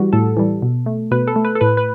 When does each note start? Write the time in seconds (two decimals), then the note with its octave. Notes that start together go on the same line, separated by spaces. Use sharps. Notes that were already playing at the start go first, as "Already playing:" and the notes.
Already playing: E3 G3 F#4
0.13 A2 A4
0.37 E3 G3
0.62 B2
0.86 A3
1.11 B2 B4
1.28 A4
1.36 A3
1.45 B4
1.55 A4
1.61 A2 B4
1.77 B4